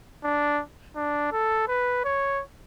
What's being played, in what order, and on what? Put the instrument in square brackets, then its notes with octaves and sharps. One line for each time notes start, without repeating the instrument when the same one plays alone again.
[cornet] D4
D4
A4
B4
C#5